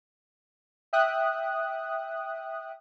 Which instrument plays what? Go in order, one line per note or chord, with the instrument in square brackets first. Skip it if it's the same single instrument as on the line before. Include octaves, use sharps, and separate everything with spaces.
[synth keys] E5 G5 D#6 F#6